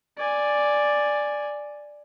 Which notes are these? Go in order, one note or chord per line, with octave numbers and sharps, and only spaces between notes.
D5 G#5